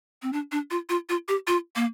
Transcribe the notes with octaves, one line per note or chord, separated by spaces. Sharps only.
C4
D4
D4
F4
F4
F4
G4
F4
A#3